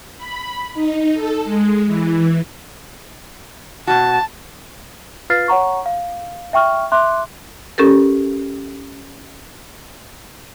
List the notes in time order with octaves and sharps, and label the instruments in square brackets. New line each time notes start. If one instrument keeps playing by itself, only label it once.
[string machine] B5
D#4
A4
G#3
E3
[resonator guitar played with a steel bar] B2 F#4 [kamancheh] A5
[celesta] F4 B4 F5 F6 A6 C7
C#5 F#5 A#5 C#6
F5
E5 G5 C#6 F6
E5 C6 D6 F#6
[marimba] C#4 G4 A4 A#4